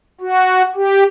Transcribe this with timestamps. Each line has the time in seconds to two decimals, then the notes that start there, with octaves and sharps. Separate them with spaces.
0.21 F#4
0.75 G4